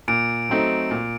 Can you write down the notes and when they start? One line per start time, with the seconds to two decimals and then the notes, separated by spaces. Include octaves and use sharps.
0.08 A#2 D7
0.49 F#3 A3 C4 D#4
0.91 A#2